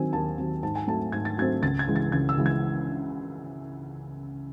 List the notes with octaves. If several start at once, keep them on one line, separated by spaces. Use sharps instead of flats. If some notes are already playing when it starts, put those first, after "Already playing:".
Already playing: D#3 F#3 C4 G#5
D#2 A5
D#3 F#3 C4
G#2 A5
G#5
F#3 A3 C4 A5
G#2 G#6
A6
F#3 A3 C4 G#6
C#2 A6
G#6
C#3 E3 G#3
A6
C#2 G#6
E6
C#3 E3 G#3
G#6